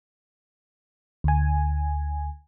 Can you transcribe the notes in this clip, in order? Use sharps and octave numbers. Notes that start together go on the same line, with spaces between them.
D2 G#5